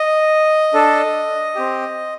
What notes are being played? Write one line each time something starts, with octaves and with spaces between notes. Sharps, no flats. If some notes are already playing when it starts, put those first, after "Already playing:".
Already playing: D#5
D4 A4
C4 G4